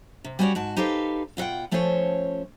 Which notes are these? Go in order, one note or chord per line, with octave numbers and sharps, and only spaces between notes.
C3
G3 C#4 E4 F#4 C#5 D5
G#2 F#4 A5
D#4 G4 A4 B4 C5 F5
B2 F4 A#4 F#5 G5
F3 A3 C#4 F4 C5 C#5